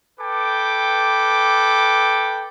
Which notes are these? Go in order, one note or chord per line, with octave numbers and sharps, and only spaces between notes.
A4 B4 G5 D6